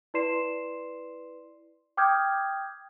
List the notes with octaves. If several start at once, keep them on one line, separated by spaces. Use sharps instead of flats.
E4 B4 D5 C6 C7 E7
G5 D6 D#6 F6 G6 G#6